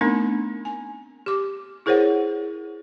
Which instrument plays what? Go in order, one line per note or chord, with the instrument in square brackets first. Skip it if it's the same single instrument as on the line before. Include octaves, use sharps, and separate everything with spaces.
[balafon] A3 B3 C4 D4 D#4 A#4
G#5
G4 D6
E4 G#4 A#4 C5 C#5 F#5